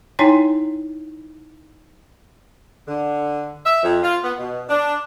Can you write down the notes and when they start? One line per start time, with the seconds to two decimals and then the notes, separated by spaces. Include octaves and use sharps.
0.19 D#4 E4 C#5 G5 G#5 C6
2.87 D3
3.65 E5
3.83 F2
4.02 F4
4.23 B3
4.38 B2
4.69 D4